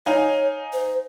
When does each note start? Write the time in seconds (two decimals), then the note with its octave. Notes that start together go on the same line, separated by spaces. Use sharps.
0.06 D#4 C#5 F5 G#5
0.73 C5